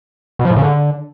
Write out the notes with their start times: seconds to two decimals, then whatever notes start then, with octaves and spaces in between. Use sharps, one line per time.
0.39 B2
0.45 F3
0.51 A2
0.56 C#3
0.62 D3